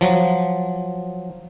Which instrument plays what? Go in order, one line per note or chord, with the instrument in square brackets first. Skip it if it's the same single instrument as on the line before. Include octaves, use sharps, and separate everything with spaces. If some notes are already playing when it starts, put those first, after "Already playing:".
[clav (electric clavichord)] F3 F#3